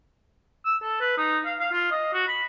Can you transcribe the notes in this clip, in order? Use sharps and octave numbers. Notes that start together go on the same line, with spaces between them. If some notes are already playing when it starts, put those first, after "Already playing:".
E6
A4
B4
D#4
F5
F5
F4
D#5
F#4
B5